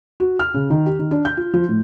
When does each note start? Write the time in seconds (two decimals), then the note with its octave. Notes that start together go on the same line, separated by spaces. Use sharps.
0.20 F#4
0.39 F6
0.54 C#3
0.70 D#3
0.86 G4
0.99 D#3
1.11 D4
1.25 G6
1.37 F4
1.54 F3
1.68 A2